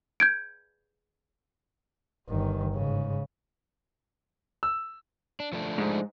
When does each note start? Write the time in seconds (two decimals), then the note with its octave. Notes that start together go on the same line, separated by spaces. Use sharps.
0.20 G6 G#6 D7
2.29 G1 D#3
2.74 G#2 C#3
4.63 E6
5.40 D4
5.52 F3 A3 D4
5.78 G#2